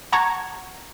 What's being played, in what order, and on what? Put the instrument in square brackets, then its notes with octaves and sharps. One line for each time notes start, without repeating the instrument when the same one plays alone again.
[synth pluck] F#5 A5 A#5 C#6 G#6